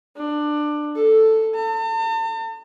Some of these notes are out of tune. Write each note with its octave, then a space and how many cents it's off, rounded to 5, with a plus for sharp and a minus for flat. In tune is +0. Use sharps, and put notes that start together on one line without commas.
D4 +20
A4 +5
A5 +45